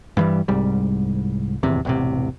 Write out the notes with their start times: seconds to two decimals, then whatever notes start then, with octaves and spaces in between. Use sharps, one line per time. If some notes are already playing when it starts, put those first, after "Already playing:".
0.17 G2 E3 G3
0.48 C2 G#2 G3
1.63 D#1 G#1 E2 C3
1.85 E1 A1 C3